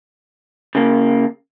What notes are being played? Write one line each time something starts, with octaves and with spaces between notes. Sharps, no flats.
C#3 A#3